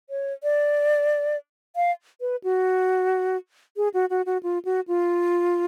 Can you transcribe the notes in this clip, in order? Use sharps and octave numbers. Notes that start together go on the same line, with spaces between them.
C#5
D5
F5
B4
F#4
G#4
F#4
F#4
F#4
F4
F#4
F4